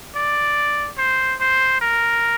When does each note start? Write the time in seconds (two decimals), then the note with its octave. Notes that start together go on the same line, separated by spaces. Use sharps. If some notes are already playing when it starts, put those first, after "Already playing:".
0.15 D5
0.98 C5
1.40 C5
1.81 A#4